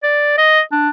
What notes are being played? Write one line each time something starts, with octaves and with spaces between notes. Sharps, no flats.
D5
D#5
D4